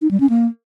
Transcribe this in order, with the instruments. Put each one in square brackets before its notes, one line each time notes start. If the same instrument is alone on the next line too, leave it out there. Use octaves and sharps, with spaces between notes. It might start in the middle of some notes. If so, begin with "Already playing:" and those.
[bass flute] D#4
G3
C#4
A#3